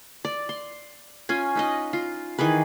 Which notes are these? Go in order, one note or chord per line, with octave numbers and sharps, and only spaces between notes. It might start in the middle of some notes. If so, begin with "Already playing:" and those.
D5
C6
C#4 F4 G#5
D#4 B4 D#5
F4
D#3 E3 G#4 B4